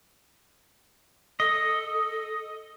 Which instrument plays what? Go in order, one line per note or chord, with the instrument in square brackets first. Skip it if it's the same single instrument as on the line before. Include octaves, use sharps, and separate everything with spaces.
[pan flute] A4 [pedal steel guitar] D#5